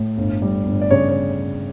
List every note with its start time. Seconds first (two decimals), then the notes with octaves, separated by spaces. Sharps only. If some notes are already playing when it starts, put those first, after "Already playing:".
Already playing: A2
0.18 G1
0.42 G3
0.66 G1
0.81 D5
0.91 C#3 C#5
1.09 C#5